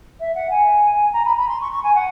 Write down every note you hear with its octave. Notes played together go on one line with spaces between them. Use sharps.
E5
F#5
G#5
A#5
B5
B5
C6
C#6
C#6
G#5
F#5